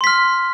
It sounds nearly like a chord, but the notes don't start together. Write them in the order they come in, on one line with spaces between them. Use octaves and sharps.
C6 B6 F6